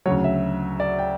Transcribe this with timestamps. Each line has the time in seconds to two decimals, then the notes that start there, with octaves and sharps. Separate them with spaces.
0.06 D2 C#3 F#3 C#5
0.24 E5
0.80 D5
0.98 G5